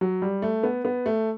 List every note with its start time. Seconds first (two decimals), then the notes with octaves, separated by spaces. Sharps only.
0.01 F#3
0.22 G3
0.42 A3
0.63 B3
0.85 B3
1.06 A3